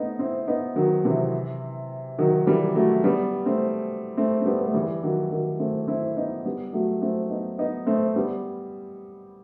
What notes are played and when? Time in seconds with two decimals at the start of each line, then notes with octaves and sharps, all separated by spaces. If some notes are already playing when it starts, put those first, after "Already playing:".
Already playing: A3 B3 C4 D#4
0.19 C4 E4
0.47 B3 D#4
0.76 D#3 F#3
1.04 C3 E3
2.18 D#3 F#3
2.47 E3 G3
2.75 F#3 A3
3.04 G3 B3
3.46 A3 C4
4.17 A3 C4
4.41 C4
4.46 G3 B3
4.58 B3
4.66 A3
4.74 E3 G3
5.03 D#3 F#3
5.31 D#3 F#3
5.59 A3 C4
5.87 C4 E4
6.17 B3 D#4
6.45 G3 B3
6.73 F#3 A3
7.02 A3 C4
7.30 B3 D#4
7.58 B3 D#4
7.86 A3 C4
8.16 G3 B3